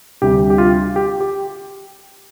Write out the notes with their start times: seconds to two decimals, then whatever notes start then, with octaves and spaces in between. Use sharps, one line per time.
0.22 D2 C3 G3 G4
0.50 G4
0.58 F4
0.96 G4
1.20 G4